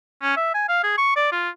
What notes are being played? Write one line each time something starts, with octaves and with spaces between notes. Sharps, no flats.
C#4
E5
G#5
F5
G#4
C#6
D5
F4